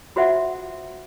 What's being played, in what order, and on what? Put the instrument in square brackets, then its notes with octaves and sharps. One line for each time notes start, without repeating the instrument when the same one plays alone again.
[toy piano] F4 F#4 C5 E5 F#5